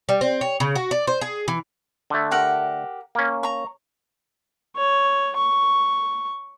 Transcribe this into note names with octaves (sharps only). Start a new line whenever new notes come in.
G3
C4
C#5
C#3
F#4
D5
C5
G#4
E3
D3 A3
G4 A#4 F#5
A#3 C#4
A#5 C#6
C#5
C#6